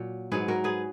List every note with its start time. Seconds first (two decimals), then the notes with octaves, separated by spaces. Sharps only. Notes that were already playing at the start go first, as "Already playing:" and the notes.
Already playing: A#2 F#3
0.31 G#2 F#3 G#4 B4
0.48 F#4 A#4
0.64 G#4 B4